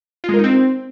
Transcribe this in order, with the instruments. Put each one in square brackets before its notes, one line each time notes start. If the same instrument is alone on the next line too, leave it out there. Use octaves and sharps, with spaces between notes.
[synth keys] F4
G#3
A#4
D#4
C4